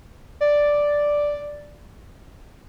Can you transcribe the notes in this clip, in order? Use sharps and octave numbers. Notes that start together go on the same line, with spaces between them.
D5